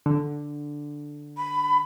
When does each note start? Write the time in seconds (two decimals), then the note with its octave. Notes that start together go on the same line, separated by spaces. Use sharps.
0.06 D3
1.37 B5